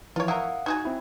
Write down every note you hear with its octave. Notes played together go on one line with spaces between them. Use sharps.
E3 F3 E4 F4 C#5
E4 A#4 F5 F#5 D#6
D#4 F#4 G#4 G#6
C4 E4